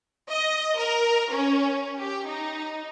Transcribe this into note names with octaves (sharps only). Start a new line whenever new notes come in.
D#5
A#4
C#4
G4
D#4